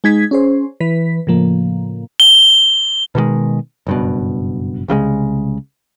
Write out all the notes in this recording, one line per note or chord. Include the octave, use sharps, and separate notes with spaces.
G#3 D#4 G#6 B6
C#4 G#4 C5
E3 B4 B6
A2 C#3 F3 A#3
G7
B2 D#3 F3 G#3
F#1 G2 B2
C2 C#3 F#3 G#3